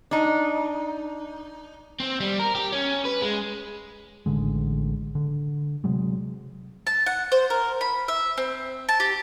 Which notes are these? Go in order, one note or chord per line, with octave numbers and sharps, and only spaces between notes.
D4 D#4
C4
G3
A#4
G4
C#4
B4
G#3
A1 D3 G#3
D3
C3 F#3 G#3
A5
F#5
C5
A#4
B5
E5
C4
A5
G4